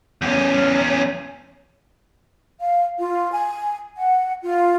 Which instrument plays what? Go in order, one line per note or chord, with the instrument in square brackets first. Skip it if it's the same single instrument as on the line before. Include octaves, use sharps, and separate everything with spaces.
[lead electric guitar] E2 C#4
[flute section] F5
F4
G#5
F#5
F4